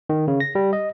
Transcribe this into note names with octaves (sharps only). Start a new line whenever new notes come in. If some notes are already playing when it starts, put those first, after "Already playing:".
D#3
C#3
A#6
G3
D#5